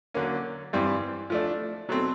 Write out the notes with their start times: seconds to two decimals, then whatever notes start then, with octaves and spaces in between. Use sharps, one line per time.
0.14 D3 F#3 A#3 C#4
0.73 G2 E3 G3 C4
1.30 F3 A3 D4
1.89 B2 F#3 A3 C4